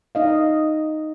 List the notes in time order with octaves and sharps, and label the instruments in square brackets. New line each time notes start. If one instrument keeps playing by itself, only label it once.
[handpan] D#4 D#5 F5